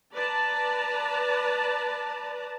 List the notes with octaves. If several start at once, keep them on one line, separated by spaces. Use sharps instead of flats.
B4 D5 A5 A#5